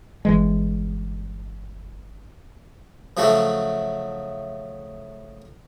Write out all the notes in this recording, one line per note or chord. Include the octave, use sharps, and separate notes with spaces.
G1 E3 G#3
C#3 F3 F#3 A3 F#4 A4